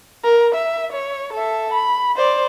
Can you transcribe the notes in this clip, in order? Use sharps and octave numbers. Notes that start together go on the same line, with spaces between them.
A#4
E5
C#5
A4 E5
B5
C5 D5